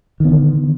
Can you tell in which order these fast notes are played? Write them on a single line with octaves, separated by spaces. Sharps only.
D#3 B3 D3